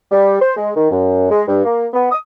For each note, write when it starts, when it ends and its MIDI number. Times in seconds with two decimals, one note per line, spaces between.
0.12 0.39 55
0.41 0.56 72
0.57 0.72 56
0.76 0.90 51
0.91 1.26 42
1.31 1.44 56
1.48 1.63 43
1.65 1.87 58
1.94 2.08 59
2.12 2.19 87